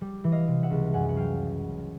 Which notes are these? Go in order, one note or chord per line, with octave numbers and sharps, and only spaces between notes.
G3
E3
D#5 F5
C3
E5 F#5
C#2
F#2 F#5 G#5
F#5
F#3 F5 G5